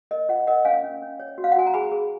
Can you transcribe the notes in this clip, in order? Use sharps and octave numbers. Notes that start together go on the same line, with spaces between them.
A#4 D#5
F4 D#5 F#5
A#4 D#5 F#5
C#4 F5 G#5
C#4
C#4
C#5
F#4
F5
F#5
F#4 G#5
A#5
G#4 G#5 B5
G#4